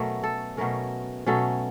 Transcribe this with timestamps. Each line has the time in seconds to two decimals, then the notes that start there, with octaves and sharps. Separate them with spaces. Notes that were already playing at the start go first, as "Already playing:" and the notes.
Already playing: B2 F#3 A3 C#4 A#4
0.23 A4
0.57 B2 F#3 A3 C#4 A#4
1.26 B2 F#3 A3 C#4 A4